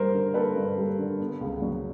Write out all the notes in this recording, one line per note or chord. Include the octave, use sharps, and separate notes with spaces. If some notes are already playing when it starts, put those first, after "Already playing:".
Already playing: G2 G3 A#3 A#4 C5
D3
A#3 A4 B4
G2
G3
D3
B3
C#2
F#3